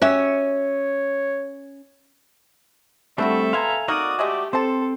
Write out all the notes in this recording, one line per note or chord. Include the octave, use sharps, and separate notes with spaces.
C#4 F#4 G4 C#5 E5
G3 A3 C4 D4 E4 F#4 A4 E5
B2 F5 G#5 A#5 C6
A#3 D#4 F#4 A#4 D5 D#6
G#3 A3 G4 D#5
C4 A4 C5 A5